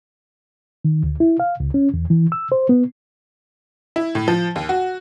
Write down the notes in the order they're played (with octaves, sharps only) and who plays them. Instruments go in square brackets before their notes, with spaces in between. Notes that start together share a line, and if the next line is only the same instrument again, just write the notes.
[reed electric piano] D#3
D2
E4
F5
C#2
C#4
E2
E3
E6
C5
B3
[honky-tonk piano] E4
A2
F3
D#2
F#4